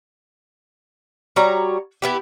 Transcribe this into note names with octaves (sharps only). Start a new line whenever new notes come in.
G3 F#4 C#5 A#5
B3 E4 G4